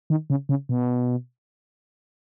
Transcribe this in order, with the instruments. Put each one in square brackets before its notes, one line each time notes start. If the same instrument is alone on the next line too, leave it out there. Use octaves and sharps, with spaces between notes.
[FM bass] D#3
C#3
C#3
B2